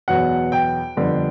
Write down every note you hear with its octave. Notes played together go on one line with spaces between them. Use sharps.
E2 B2 F#3 B3 F#5
G5
F2 D3 G3 B3